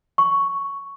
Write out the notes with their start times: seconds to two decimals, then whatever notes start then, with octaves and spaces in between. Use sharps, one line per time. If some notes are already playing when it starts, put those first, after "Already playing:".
0.18 C#6